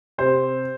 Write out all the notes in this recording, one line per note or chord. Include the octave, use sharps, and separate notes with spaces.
C3 C5